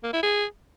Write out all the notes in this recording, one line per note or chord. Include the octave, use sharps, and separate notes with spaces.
A#3
E4
G#4